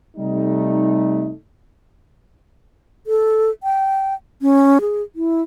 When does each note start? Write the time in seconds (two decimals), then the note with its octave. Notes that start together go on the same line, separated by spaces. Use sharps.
0.17 C3 G3 A3 D#4
3.07 A4
3.63 G5
4.42 C#4
4.81 G#4
5.16 E4